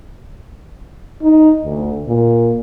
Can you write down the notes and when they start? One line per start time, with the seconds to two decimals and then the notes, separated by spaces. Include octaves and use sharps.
1.22 D#4
1.64 D2
2.07 A#2